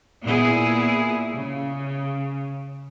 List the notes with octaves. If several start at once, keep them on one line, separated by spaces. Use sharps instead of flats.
A#2 B3 E4 G#4
C#3